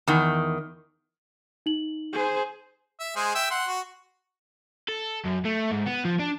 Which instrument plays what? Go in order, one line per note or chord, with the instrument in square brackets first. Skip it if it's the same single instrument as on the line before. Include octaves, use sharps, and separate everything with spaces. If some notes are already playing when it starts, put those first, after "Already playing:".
[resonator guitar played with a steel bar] E2 D#3
[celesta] D#4 F#7
[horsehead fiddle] G#4 C5
[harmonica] E5
G#3 G#4 C5
E5 G5 E6
F#5 C6
F#4
[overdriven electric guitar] A4
F#2
A3
G#2
B3
F3
D4